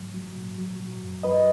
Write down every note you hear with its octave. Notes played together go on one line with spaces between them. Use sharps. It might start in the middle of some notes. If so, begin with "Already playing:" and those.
Already playing: G#2 F#3
F#3
A#2
F#3
F#3
F#2
F#3 B4 D#5